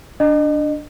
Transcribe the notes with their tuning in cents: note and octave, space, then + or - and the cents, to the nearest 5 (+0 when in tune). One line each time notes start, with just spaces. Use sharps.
D4 +0 D#5 -30